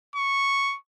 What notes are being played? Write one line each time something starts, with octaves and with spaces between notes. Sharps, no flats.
C#6